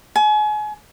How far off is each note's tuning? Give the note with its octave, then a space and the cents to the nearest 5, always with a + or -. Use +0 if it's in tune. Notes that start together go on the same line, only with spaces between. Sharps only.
G#5 +35